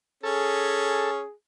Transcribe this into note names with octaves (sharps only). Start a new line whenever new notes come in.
C#4 G#4 A4